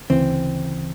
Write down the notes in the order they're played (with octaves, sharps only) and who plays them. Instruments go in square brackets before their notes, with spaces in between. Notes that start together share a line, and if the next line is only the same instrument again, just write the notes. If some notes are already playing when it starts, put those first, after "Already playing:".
[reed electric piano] D2 C#3 E3 [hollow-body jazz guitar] C4